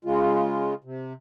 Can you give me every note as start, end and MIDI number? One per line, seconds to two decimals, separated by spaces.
0.05 0.74 49
0.05 0.74 56
0.05 0.74 65
0.84 1.13 48